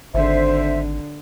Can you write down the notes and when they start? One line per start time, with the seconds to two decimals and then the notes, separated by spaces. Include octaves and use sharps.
0.14 G#1 D3 C5 E5